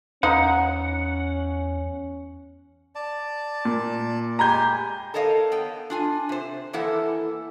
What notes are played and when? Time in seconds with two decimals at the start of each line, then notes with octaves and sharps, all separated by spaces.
0.23 E2 C#4 D#4 C5 F5 F#5
2.95 D5 A5
3.65 A#2
4.39 G#3 G4 G#5 A#5 B5 G6
5.14 A4 A#4 C#5 D#5 F5
5.52 B3 G5
5.90 D4 F4 G#5
6.29 C3 C5
6.73 E2 E3 A#3 E4 A4 F#5